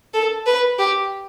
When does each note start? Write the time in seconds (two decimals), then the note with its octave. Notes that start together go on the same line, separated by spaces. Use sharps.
0.14 A4
0.46 B4
0.79 G4